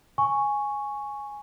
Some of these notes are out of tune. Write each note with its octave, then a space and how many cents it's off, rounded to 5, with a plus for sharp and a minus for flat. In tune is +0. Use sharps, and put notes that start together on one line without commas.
G#5 +0 C#6 +0